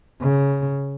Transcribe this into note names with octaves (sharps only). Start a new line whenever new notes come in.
C#3